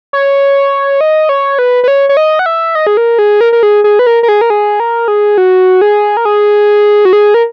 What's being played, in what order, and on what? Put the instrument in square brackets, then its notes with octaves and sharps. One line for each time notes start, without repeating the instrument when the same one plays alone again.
[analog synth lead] C#5
D#5
C#5
B4
B4
C#5
C#5
D#5
F#5
E5
D#5
G#4
A#4
G#4
A#4
A#4
G#4
G#4
B4
A#4
A#4
G#4
A#4
G#4
A#4
G#4
F#4
G#4
A#4
G#4
F#4
G#4
A#4